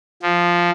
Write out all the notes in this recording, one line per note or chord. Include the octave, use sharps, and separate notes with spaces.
F3